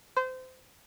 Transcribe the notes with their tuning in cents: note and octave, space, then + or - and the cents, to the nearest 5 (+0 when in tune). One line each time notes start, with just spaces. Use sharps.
C5 -25